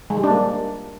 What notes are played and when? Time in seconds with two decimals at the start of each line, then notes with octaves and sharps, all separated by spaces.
0.10 G#3
0.17 G3
0.24 D4
0.30 A#3